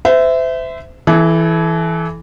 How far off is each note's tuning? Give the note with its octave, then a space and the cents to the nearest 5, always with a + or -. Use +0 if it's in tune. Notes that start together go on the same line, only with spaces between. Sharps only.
C5 -35 E5 +0
E3 +0 E4 +0 A4 -35